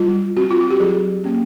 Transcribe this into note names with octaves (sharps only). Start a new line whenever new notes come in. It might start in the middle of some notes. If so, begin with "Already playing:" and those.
Already playing: G3 F4
C4 F#4
F4
F#4
G4
F#3 G#4
A#3 C#4